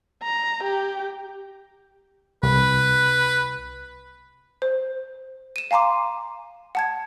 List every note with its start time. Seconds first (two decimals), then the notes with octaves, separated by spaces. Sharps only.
0.23 A#5
0.64 G4
2.43 C2 B4
4.62 C5
5.56 D#7 E7
5.71 F5 G#5 A#5 C6 D6
6.75 F#5 A5 G#6